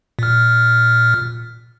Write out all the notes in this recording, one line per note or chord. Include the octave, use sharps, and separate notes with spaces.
A#2 F6